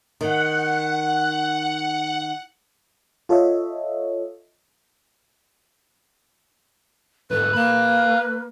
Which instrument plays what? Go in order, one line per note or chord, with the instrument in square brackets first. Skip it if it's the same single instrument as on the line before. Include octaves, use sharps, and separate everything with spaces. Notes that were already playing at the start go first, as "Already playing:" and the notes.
[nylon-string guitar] D#3 [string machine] F#5
[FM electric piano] F4 A4 C#5 D#5 E5
[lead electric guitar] G#2 D3 [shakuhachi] A4 [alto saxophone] B4
[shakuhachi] A#3 [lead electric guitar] F5 B5